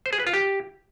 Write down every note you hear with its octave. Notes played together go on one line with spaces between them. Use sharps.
C5
G#4
B4
F4
G4